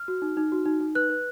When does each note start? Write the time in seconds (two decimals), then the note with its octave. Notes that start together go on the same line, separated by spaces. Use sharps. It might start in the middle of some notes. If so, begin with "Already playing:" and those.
Already playing: F6
0.08 F#4
0.22 D#4
0.37 D#4
0.52 F#4
0.66 D#4
0.81 D#4
0.95 B4 F#6
1.10 B4